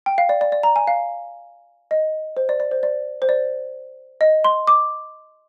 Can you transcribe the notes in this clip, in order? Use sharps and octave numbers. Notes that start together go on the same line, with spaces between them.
G5
F5
D5
D5
D5
A#5
G#5
F5
D#5
C5
D5
D5
C5
D5
C5
D5
D#5
C6
D6